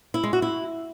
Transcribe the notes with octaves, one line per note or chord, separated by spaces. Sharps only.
E4
G#3
F#4
E4